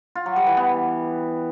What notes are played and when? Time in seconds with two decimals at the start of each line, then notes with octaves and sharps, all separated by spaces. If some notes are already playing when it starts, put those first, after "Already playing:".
0.15 F4
0.26 F#3
0.36 G3
0.47 E3
0.57 B3